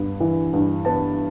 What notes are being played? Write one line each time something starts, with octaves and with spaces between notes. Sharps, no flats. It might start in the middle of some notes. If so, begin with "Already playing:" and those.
Already playing: G2 B3
E3
G2
B3 A5